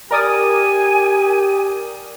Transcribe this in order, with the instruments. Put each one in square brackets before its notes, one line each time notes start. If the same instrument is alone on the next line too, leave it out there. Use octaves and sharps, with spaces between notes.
[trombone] G4 [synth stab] A#4 D5 D#6 [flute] G#5